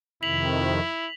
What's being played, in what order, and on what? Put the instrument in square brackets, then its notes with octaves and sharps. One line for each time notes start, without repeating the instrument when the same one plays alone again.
[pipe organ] F2 C3 D#3 [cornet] E4 [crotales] B6 F7 F#7